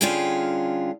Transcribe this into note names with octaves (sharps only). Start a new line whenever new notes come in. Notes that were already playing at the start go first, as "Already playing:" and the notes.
D3 G3 C#4 F4 G#4 G5